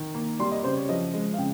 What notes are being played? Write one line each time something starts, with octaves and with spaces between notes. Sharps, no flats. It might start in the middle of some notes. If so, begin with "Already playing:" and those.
Already playing: D#3
A#3
G3 C6
D#5
C#3 C5
C#5
F3 D#5
G#3
F5
C#3 G5